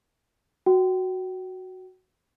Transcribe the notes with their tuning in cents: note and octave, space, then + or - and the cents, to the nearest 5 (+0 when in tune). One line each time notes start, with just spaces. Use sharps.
F#4 +0 G5 -30